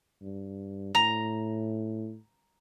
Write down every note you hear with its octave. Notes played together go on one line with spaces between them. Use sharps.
G2
A2 A#5